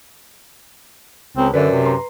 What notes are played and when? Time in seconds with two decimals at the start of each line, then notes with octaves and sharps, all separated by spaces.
1.37 C#2 C4
1.54 F#2 D3 B4 D5 E5
1.71 C3
1.86 B4 A#5 C6